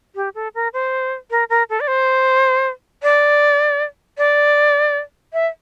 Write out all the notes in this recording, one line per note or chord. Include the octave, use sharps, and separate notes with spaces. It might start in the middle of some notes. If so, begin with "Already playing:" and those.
G4
A4
A#4
C5
A#4
A#4
A4
D5
C5
D5
D5
E5